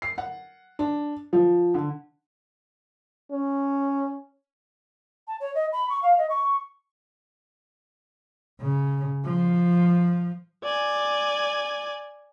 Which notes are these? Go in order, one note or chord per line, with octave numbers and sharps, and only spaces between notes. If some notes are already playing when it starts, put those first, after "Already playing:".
C7
F#5
D4
F3
D3
C#4
A5
C#5
D#5
B5
C#6
F5
D#5
C#6
C#3
F3
D5 G#5